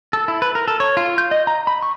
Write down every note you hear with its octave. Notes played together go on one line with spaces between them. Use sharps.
A4
E4
B4
A#4
A4
C#5
F4
G6
D#5
A#5
B5
C#6